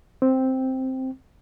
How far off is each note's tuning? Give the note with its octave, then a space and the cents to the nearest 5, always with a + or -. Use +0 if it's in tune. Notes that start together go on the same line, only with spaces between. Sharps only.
C4 +0 G5 +0